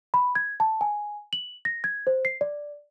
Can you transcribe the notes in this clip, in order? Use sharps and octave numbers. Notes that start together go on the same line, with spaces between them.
B5
G#6
A5
G#5
F#7
A#6
G#6
C5
C7
D5